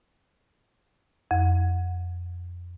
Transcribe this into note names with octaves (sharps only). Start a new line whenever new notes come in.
F2